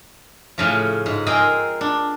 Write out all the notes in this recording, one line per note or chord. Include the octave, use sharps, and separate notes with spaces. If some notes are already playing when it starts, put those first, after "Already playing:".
A2 C#3 F3
G#2
C4 G#4 A#4 D#5 G5
D4